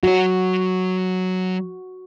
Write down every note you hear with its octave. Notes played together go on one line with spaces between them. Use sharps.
F#3 F#4 C#5